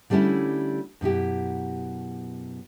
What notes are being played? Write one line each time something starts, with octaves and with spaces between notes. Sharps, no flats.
D3 G3 A3 C#4 E4
F#2 B2 E4 G4